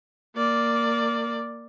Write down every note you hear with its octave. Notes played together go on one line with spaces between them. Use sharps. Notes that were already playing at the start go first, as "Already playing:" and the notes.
A#3 D5